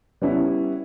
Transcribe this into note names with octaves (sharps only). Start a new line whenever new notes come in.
G3 B3 C#4 E4